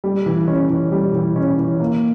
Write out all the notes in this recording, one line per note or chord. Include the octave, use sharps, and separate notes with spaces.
G3
E3
C#4
E3
G3
E3
C#4
E3
A#3